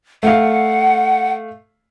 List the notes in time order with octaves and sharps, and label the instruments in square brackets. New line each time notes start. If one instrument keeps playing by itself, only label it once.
[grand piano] A3 F5 [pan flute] F#5